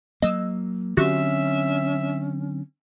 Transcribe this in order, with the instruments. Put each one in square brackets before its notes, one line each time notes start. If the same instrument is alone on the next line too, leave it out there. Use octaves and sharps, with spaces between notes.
[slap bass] F#3 A#3 [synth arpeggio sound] D#5 E6
[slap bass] D3 F#3 C4 [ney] C#4 [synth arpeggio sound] F#4 G4 [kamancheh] E5